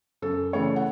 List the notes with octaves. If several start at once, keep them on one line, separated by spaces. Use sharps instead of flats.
F#2 A4
C#3 E3 A3 C#5
F#5